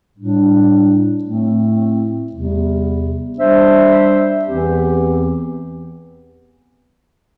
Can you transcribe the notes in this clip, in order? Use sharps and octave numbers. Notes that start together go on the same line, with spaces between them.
A2 G3 D4
A2 A3 C4
E2 C3 G3
G3 D4 C5 E5
E2 E3 C4 G4